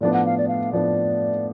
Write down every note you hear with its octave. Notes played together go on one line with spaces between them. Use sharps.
A2 F3 B3 D4 D5
F#5
F5
D5
F5
A2 F3 B3 D4 D5